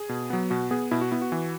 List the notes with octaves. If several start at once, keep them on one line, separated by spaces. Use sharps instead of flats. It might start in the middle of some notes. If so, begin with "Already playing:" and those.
Already playing: G#4
B2
F#3 B3
B2 F#4
B3 G#4
B2 E4
F#4
B3 E4
F#4
E3